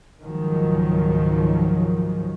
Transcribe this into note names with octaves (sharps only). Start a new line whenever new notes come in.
C#2 G#2 D#3 F3 F#3